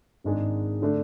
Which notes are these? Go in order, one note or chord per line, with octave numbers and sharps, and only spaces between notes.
G#1 G#2 G#3 D4 G#4
D3 A3 D4